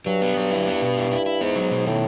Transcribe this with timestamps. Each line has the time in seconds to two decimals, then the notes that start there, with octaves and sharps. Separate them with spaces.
0.06 G2 F#3
0.22 B3
0.37 F#3
0.51 E4
0.67 B3
0.82 B2
0.97 E4
1.11 E4
1.26 E4
1.41 G#2 B3
1.56 F#3
1.71 B2
1.86 A2 D#3